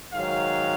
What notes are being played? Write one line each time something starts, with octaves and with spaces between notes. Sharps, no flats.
G#2 D#3 F#3 F5